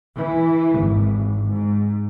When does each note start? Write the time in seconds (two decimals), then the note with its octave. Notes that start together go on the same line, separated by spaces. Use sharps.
0.16 E3
0.77 G#1
1.50 G#2